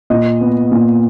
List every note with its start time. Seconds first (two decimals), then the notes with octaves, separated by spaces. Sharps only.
0.10 A#2 D#5
0.41 B3
0.72 A#2